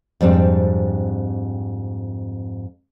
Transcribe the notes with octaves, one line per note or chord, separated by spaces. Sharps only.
F2 G#2 G3 C4 D4